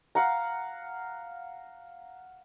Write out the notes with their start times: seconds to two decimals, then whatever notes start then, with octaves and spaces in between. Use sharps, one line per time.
0.15 F5 F#5 A#5